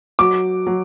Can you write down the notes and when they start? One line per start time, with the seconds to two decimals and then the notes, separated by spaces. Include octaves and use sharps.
0.19 F#3 D6
0.67 F#3